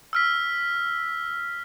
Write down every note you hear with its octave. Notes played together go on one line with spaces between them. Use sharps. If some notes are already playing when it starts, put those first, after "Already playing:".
E6 F6 B6